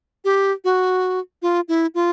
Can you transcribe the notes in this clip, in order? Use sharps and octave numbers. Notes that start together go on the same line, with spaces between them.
G4
F#4
F4
E4
F4